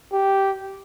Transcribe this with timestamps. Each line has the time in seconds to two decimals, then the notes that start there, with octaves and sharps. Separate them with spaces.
0.13 G4